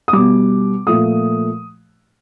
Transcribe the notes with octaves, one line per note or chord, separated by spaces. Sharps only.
D#6
B2 G3 D6
A#2 F3 A3 D#6